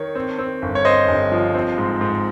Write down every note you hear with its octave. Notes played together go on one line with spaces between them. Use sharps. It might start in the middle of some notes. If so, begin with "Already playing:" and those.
Already playing: D#3 C#5
C4
C4
G1
C#5
C4 C5 D#5
G1
F3
C4
G#2
G#2